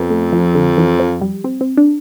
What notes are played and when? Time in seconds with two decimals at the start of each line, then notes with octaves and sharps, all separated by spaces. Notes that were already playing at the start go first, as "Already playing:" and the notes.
Already playing: F2 B3
0.11 A3
0.33 F3
0.55 D3
0.77 E3
1.00 F3
1.21 G3
1.44 C4
1.61 C4
1.77 D4